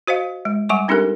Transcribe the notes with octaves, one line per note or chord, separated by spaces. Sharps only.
F#4 C5 D#5 F5
G#3
G3 F#5 G#5 C#6 D6
C4 D4 D#4 G4 A4 A#4